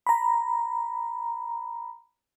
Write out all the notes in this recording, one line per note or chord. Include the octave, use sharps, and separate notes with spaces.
A#5 B5